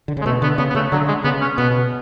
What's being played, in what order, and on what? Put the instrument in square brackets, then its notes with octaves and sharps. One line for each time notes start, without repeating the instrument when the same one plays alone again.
[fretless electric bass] D3
C#3
[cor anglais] G#3
[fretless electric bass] B2 [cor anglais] A3
[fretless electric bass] D3 [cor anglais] B3
[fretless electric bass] C#3 [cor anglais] B3
[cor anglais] B3
[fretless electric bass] C#3 [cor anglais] A3
[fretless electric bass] D3 [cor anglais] F#3
[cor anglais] G#3
[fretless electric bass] C#3 [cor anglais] B3
[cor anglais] C#4
[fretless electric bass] B2 [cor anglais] B3